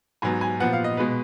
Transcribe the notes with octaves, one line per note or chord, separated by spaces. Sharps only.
G#2 F#3 B3 G#5
G#5
A#2 F3 B3 F#5
F5
D#5
B2 G#3 B3 B4